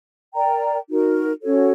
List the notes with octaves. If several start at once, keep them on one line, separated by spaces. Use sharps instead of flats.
A#4 D5 G5 A#5
D#4 F#4 A#4
C#4 F#4 A4 C#5